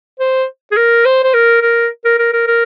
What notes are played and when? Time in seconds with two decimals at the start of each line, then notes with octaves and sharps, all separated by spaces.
0.20 C5
0.71 G#4
0.77 A#4
1.05 C5
1.24 C5
1.34 A#4
1.62 A#4
2.05 A#4
2.19 A#4
2.33 A#4
2.47 A#4